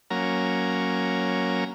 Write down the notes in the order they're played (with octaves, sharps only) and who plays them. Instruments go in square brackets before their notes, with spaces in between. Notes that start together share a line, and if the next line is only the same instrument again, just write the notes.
[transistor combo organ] F#3 A#3 C#4 A#5